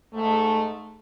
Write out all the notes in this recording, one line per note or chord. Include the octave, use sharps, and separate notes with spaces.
G#2 A3